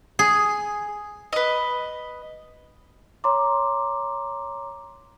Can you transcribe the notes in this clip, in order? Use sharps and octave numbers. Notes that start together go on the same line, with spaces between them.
G#4
B4 D#5
C#5 A#5 C6 D6